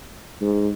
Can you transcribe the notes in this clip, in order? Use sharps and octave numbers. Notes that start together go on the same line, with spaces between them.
G#2